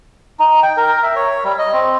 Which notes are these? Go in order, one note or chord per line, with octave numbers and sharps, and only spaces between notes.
D#4
G5
A#4
E5
C#5
G3
D#5
C4